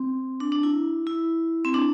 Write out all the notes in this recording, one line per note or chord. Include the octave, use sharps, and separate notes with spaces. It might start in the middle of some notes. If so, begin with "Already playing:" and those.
Already playing: C4
D4
D4
E4
E4
C4
D4